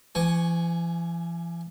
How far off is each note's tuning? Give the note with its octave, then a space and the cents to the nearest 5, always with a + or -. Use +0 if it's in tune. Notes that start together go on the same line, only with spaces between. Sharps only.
E3 +45 G#5 +0 C#6 +0